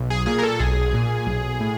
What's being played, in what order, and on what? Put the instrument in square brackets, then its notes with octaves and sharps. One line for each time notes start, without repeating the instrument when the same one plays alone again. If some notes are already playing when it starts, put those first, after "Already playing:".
Already playing: [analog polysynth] B1
G#4
A#2 G#4
A#4
A4
B1 G#4
A#2
B1
A2